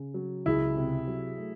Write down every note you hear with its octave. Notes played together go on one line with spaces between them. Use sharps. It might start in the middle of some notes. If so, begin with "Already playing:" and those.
Already playing: C#3
F#3
C#2 E4 G#4
C3
F#3
A3